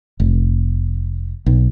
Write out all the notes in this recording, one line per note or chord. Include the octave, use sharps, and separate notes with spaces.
F1
B1